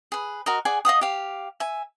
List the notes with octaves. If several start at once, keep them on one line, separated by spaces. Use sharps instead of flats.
G#4 B4
F#4 A#4 D#5
G#4 D5 F#5 G#5
D#5 F5 F#5 D#6
G4 F5
E5 G#5